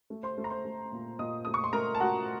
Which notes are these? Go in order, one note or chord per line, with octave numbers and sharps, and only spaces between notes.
A3
C5 C6
A3
A#5
C5 C6
A3
A#2
A#2 D#5 D#6
A3 D#6
C#6
C6
A3 A#4 A#5
A5
A3 F#4 F#5